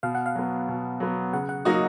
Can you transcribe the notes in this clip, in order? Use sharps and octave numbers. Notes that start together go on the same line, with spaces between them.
B2 F5
F#5
F5
F#3 B3
B2
F#3 B3
C#3 F#5
F#5
F#3 A#3 D#4 F#4 D#5